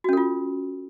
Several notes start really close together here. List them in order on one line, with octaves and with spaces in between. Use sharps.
F#4 C#4 A4 F4